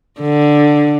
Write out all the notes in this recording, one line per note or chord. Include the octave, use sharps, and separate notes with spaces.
D3